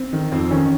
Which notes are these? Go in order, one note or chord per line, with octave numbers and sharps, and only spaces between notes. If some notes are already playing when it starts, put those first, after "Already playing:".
Already playing: C4
D#3
F2 C4
D#3 C#4